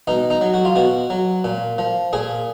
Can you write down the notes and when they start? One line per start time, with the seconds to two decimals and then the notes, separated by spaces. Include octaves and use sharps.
0.07 B2 D#4
0.30 D#4
0.41 F#3
0.54 F#4
0.65 F4
0.76 B2 F#4
1.10 F#3
1.44 A#2
1.78 F3
2.13 A#2 G#4